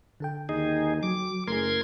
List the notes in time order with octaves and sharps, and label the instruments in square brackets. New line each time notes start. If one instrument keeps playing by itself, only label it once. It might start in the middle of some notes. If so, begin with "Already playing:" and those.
[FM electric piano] D3 A4 G5
[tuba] D#2 [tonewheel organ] D#4 G#4
[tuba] F#3 [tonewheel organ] D6
[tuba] F#1 [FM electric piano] A3 G#4 [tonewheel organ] A#4 C6 G#6